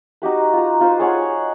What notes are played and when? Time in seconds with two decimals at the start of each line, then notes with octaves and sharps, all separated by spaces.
0.22 D#4 F#4 G4 B4
0.53 F4 A#5
0.80 D#4 F4 B4 C5
0.99 G#4 C#5 F#5 G#5